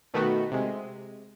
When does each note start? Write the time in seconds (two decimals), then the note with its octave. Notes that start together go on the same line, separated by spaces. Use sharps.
0.14 B2 D#3 A3 B3 F#4
0.52 C3 G#3